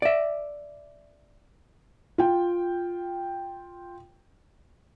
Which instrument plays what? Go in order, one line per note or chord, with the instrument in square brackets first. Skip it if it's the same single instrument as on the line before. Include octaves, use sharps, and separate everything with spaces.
[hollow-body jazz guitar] D5 E5
[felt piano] F4 G5